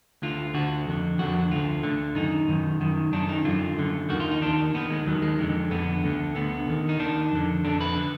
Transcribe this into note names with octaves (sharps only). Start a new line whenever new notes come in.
D2 D3 F4
D2 D3 F#4
F2 D3
F2 D3 F#4
D2 D3 F4
D2 D3
F#2 D#3 D#4
F#2 D#3
F#2 D#3
F#2 D#3 D4
D#4
F#2 D3 F4
F#2 D3
D#2 D#3 F#4
F4
D#4
D#2 D#3 D4
D#2 D#3 B3
G#3
D#2 D#3 F#3
G#3
F2 D3 G#3
F2 D3 B3
D2 D3
D2 D3 B3
D#2 D#3
D#4
D#2 D#3 D4
F2 D3
F2 D3 D4
B4
D3